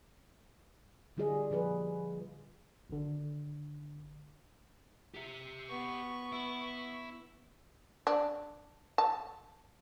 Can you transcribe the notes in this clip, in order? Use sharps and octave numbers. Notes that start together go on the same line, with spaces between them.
D3 G3 F4 G#4 D#5
A#2 F3 G#4 B4
G#1 D3
G4 E5
B3 C#6
E4
D4
A5